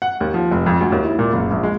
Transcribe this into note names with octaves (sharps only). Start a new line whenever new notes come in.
F#5
D#2
F3
F1
F2
D2
D#2
E4
A#2
F#1
A#1
G#3